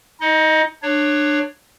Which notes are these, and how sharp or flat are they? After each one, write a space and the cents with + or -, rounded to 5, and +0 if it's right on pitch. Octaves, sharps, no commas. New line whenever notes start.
D#4 +30 D#5 +0
D4 +20 C#5 +0